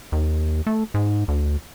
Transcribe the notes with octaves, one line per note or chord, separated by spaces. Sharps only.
D#2
A3
G#2
D2